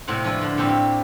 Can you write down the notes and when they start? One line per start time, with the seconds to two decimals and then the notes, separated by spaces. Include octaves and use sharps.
0.07 A2 C3 A3 A#3 C4 F#5
0.24 F3 D4 E4 F4 B4
0.41 D3 D4
0.57 A2 G3 A#3 C4 G4 A4
0.70 G4